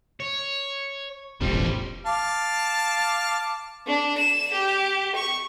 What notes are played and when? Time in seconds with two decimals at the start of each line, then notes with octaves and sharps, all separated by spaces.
0.20 C#5
1.41 E1 A1 F3 G3
2.06 F5 A5 D6
3.87 D4
4.17 E7
4.52 G4
5.15 C#6